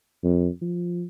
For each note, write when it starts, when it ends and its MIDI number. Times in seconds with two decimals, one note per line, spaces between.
0.24 0.48 41
0.61 1.04 53